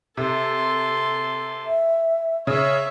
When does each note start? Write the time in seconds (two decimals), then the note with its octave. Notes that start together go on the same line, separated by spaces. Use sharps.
0.17 C3 A4 C6
1.67 E5
2.47 C#3 C#5 E5